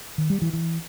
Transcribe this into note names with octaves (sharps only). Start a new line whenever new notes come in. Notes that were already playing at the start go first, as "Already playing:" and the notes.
D#3
G3
E3
E3